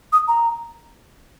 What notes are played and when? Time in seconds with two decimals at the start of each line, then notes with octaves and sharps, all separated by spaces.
0.13 D#6
0.28 A#5